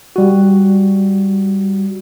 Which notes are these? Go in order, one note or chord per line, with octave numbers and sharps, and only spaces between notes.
G3 F#4